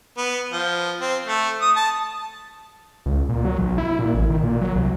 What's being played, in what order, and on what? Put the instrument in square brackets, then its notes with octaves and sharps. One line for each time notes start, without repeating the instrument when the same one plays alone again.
[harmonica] B3
F3
C4
A3
D#6
A5
[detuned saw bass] C#2
A#2
F#3
B1
E4
A#2
A1
D#3
A#2
F#3
C2